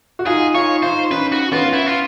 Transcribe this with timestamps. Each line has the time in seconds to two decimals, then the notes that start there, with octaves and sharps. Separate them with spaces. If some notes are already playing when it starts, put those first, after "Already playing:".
0.19 F#4
0.26 D#4 F4 G#4
0.55 D#4 F4 C#5
0.83 D#4 F4 C5
1.10 C#4 D#4 B4
1.32 F#4
1.52 B3 C#4 F4
1.73 E4
1.86 F4